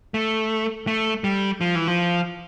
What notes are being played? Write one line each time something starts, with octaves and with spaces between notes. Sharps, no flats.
A3
A3
G3
F3
E3
F3